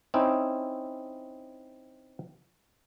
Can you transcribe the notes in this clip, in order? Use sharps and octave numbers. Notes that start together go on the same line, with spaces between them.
C4 C#4 D#4 E4